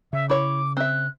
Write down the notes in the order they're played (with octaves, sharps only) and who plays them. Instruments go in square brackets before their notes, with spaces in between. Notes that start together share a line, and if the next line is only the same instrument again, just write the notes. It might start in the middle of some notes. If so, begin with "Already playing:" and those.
[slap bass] C#3 [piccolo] E5
[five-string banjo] E4 C#5 [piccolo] D6
[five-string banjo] C4 E5 [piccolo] F#6